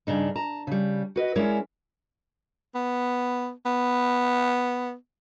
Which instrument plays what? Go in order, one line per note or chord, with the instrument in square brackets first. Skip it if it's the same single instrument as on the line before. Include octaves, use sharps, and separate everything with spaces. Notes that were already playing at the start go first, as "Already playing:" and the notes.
[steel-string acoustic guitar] G2 A#2 C#3 D4 D#4
A5 A#5
C#3 G3
F#4 B4 D#5
G#3 C#4 E4 A#4 C#5 D5
[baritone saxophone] B3
B3